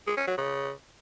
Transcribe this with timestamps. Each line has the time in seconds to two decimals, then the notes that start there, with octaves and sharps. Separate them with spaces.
0.07 G#3
0.17 C#4
0.27 F#3
0.38 C#3